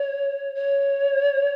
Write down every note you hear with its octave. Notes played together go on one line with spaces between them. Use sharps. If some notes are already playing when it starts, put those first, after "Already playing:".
Already playing: C#5
C#5